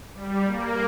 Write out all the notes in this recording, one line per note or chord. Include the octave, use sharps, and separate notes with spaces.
G3
A#3